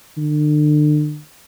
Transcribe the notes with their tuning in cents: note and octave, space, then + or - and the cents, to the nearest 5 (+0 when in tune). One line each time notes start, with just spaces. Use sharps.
D3 +40